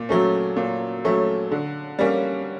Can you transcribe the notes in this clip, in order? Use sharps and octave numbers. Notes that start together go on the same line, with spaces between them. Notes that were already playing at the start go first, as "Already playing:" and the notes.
Already playing: A#2
F#3 A3 C#4
A#2
F#3 A3 C#4
D3
G3 A#3 C#4